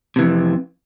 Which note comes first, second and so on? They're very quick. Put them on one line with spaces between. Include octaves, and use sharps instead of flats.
C3 E3 F2